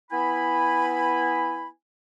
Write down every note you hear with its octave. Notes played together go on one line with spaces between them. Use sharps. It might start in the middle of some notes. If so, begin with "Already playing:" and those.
B3 E4 G#5 B5